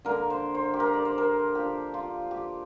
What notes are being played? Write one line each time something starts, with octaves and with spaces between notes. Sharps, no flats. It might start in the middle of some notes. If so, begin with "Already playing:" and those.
D3 A#3 D4 A#4
C5
C5
G4
A#4
D5
C5
A#4
F3 D4 G4
F4
G4